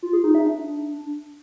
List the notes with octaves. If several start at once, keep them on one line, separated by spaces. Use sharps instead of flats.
F4
G#4
D#4
E5
D4